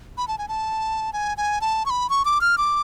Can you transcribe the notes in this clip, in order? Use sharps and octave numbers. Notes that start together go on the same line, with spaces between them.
B5
A5
G#5
A5
G#5
G#5
A5
C#6
B5
C#6
D6
F6
D6